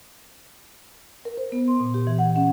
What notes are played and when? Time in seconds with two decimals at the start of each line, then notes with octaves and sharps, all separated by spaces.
1.25 A#4
1.37 C5
1.52 B3
1.68 C6
1.80 A#2
1.94 G4
2.07 E3
2.19 F#5
2.36 C#4